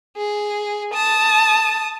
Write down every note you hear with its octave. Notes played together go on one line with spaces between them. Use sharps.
G#4
A5 D#6